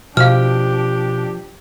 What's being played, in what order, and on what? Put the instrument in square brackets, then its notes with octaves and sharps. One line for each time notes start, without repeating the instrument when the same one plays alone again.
[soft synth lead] B2 [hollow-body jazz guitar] F3 [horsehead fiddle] D4 G4 [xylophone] F5 F6